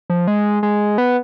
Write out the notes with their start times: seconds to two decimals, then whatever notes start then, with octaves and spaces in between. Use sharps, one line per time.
0.10 F3
0.28 G#3
0.63 G#3
0.98 B3